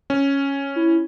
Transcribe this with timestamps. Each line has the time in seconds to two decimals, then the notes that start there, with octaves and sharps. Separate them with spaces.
0.10 C#4
0.76 E4